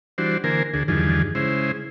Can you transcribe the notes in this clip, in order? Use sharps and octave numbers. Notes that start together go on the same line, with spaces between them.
E3 G3 D4 F#4 C5
D3 E3 A#3 A#4 C5 G#5
D2 D3 G#4
E2 G2 D3 D#3 F3 G#4
C#3 G#3 E4 C5